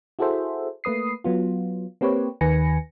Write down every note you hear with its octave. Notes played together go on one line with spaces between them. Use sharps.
E4 F#4 G#4 A4 C5 E5
A3 A#3 B4 D#6 C7
F#3 B3 F4
A#3 C4 G4 B4 C#5
D#2 D#3 B4 G#5 A#6 C#7